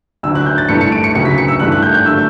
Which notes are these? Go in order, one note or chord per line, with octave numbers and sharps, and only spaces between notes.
D2 D3 F#3 E6
F#6
G6
A6
G2 E3 A3 C#7
C#7
D7
C#7
D2 C#3 F#3 C#7
B6
C#7
E6
G2 E3 A3 F#6
F#6
G6
G6
D3 F#3 A3 E6